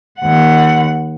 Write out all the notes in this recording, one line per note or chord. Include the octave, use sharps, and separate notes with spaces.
D#2 F#5